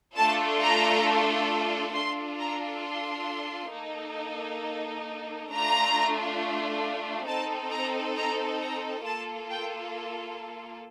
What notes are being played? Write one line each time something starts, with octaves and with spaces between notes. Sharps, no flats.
A3 D4 F4 A4 A5
A#5
D4 F4 A4 C6
A#5
C6
A#3 D#4 A4
A3 D4 F4 A#5
C4 D#4 A4 A5
A#5
A#5
A#5
A#3 F4 A4 A5
G5